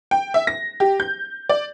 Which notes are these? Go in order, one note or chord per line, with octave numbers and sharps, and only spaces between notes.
G5
E5
A#6
G4
G6
D5